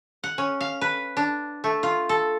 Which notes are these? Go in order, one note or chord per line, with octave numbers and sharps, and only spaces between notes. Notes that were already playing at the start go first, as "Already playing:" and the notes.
F#5
C#4
F5
B4
D4
A3
F4
A4